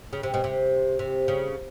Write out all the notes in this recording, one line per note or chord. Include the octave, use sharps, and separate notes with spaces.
C#3
C3
B2
C3
C3
C#3